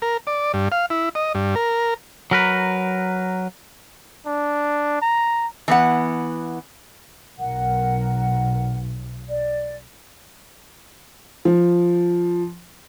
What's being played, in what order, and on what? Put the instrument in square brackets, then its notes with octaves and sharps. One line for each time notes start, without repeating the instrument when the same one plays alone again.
[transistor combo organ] A#4
D5
G2
F5
E4
D#5
G2
A#4
[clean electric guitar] F#3 A#4 B4
[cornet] D4
A#5
[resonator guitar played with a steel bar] E3 B3 F#5
[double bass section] B1 [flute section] A#4 F#5
[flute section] D5
[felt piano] F3